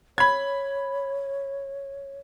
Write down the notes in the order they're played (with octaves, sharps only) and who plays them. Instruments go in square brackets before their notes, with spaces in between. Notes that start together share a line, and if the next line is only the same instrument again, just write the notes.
[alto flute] C#5 [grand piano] B5 G#6